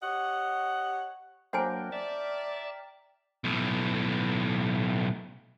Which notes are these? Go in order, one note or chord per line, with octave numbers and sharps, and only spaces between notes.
G4 C#5 D#5 F#5
F#3 A#3 D4 F#4 A#4 C5 G5 G#5
D5 E5 A5
B1 A2